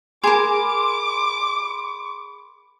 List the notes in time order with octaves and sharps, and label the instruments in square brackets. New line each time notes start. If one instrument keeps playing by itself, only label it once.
[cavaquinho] G#4 A#4 [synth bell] B5 C6 [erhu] D6